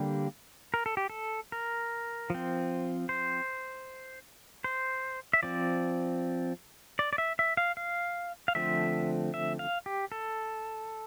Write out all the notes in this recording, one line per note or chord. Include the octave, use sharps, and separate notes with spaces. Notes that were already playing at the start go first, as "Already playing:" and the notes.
Already playing: D3 G3 A#3 G4
A#4
A4
G4
A4
A#4
F3 C4
C5
C5
E5
F3 C4 D5
D5
D5
E5
E5
F5
F5
F5
D3 F3 A3 C4 E5
E5
F5
G4
A4